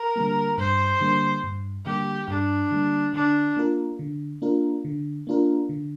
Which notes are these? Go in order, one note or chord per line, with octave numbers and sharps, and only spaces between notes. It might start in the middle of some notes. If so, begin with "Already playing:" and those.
Already playing: A#4
D3 G3 A#3
G2 C5
D3 G3 A#3
G2
D3 G3 A#3 G4
G2 D4
D3 G3 A#3
D3 D4
A#3 D4 F4 A#4
D3
A#3 D4 F4 A#4
D3
A#3 D4 F4 A#4
D3